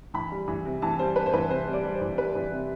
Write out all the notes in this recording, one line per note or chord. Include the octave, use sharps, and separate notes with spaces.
E3 B5
G3
E3
C3
E3 A5
G3 C5
G3 B4
C5
E3 B4
C3 C5
G3
D5
G3
C5
E3
G3 B4
E3
C3